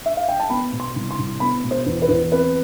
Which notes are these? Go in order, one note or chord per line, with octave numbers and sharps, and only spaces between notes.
E5
F5
G5
A5
B3 B5
B2
C6
C2
C6
C2
B3 B5
B2
C5
E2
B4
E2
C4 B4